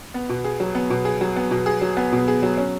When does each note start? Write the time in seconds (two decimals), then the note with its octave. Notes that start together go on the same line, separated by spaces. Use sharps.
0.14 B3
0.29 B2
0.44 G#4
0.60 F#3
0.75 B3
0.90 B2
1.05 G#4
1.21 F#3
1.36 B3
1.51 B2
1.66 G#4
1.81 F#3
1.97 B3
2.12 B2
2.28 G#4
2.43 F#3
2.57 C#4